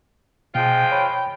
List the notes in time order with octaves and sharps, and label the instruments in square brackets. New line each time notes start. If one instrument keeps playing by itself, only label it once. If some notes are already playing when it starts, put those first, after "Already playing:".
[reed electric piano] B2 [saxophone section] F3 G#3 F4 [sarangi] G5
[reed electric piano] C#5 B5